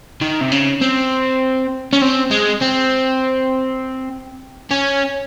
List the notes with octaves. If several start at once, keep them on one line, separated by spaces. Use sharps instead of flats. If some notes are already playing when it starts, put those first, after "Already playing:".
D#3
C3
C#3
C4
C#4
C4
G#3
C4
C#4